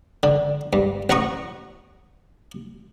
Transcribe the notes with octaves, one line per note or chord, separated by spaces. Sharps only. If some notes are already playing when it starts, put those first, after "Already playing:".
D3
G2
A1 F#5 A#5 C#6 D#6